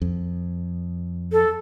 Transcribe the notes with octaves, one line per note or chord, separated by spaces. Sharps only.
F2
A4